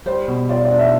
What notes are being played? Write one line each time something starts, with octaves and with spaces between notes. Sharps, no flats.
G3 C5
B2
F4 D5
D5
D4
E5